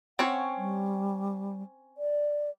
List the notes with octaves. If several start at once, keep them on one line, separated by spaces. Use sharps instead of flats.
C4 C#4 C#5 F#5
G3
D5